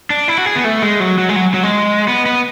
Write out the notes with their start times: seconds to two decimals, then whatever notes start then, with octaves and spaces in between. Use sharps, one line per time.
0.10 D4
0.28 E4
0.38 F#4
0.47 G#4
0.56 B3
0.64 A3
0.83 G#3
1.00 F#3
1.18 F#3
1.29 G#3
1.36 F#3
1.54 F#3
1.63 G#3
2.08 B3
2.26 B3